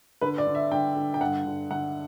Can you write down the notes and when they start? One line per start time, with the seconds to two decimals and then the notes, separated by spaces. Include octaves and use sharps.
0.21 D3 B4
0.38 D5
0.47 D3
0.55 E5
0.71 D3 G5
0.96 D3
1.14 G5
1.21 G2 F#5
1.46 D3
1.70 D3 F#5